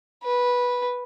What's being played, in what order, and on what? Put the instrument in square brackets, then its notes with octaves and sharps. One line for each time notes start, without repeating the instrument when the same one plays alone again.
[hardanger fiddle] B4